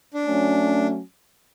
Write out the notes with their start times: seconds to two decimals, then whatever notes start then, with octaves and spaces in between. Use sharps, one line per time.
0.14 D4
0.25 F#3 A3 C#4